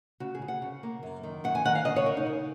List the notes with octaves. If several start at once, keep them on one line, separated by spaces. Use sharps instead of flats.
C#3 F#4
G#4
C#3
F#5
C#3
A#3
F#2
D#3
F#2 F#5
G#5
D#3 F#5
F5
C#3 D#5
C#5
C#3 A#4
D#4
C#3